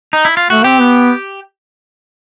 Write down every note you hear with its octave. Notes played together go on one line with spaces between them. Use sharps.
D#4
E4
F4
A3 F#4
C4 G4
B3